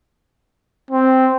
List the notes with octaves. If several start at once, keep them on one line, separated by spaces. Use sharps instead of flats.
C4